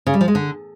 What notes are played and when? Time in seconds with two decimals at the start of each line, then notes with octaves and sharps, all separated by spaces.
0.07 C#3
0.14 G3
0.21 F3
0.28 G#3
0.35 D3